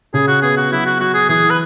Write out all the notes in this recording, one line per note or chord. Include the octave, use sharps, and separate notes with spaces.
C#3 G#4
F#4
B3 G#4
F#4
F#3 E4
F#4
F#3 F#4
G#4
E3 G#4
B4